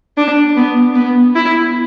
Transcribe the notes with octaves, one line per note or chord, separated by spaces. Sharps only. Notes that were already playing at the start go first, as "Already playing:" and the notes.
D4
B3
B3
E4